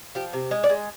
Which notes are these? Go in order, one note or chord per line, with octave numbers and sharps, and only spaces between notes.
F3 G4
C3
G#3
D5
G#3